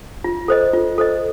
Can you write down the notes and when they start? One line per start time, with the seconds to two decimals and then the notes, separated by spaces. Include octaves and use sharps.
0.24 F4
0.48 A4 C5 D#5
0.73 F4
0.98 A4 C5 D#5